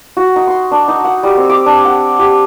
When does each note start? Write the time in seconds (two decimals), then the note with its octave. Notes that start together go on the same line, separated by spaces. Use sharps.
0.17 F#4
0.36 D#4
0.47 C6
0.71 D4
0.88 D#4
1.04 F#5
1.23 G3
1.37 C4
1.50 D6
1.66 D4
1.85 F#5
2.19 G4